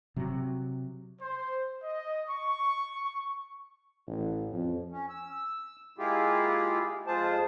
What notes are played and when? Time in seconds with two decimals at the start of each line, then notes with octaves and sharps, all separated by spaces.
0.16 C3 F#3
1.19 C5
1.81 D#5
2.29 C#6
4.08 A1
4.53 F2
4.90 C#4
5.09 E6
5.98 G#3 A#3 E4 F4 G4 G#4
7.07 F2 G#3 F4 G#4 C5 A5